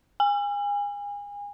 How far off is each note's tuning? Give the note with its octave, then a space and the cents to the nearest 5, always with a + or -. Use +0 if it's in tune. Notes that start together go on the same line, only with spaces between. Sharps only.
G#5 -30